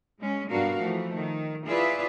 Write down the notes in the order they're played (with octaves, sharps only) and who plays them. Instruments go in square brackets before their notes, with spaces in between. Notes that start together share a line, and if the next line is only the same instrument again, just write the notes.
[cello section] G#3 C#4
G2 B2 D4 F#4 A#4 F5
E3 F3 A3
D#3
E4 F4 G#4 B4 D5 E5